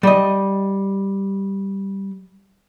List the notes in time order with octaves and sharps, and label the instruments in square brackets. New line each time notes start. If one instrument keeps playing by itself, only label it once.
[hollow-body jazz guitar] G3 D#5